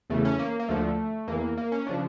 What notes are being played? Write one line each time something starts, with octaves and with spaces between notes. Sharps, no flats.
E2 C#3 E3 A3
C#4
A#3
A#3
D2 D3 F3 A3
E2 E3 A#3
A#3
C#4
C#3 F3 D4